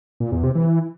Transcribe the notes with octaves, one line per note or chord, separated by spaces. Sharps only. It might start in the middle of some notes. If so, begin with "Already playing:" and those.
A#2
E2
C3
E3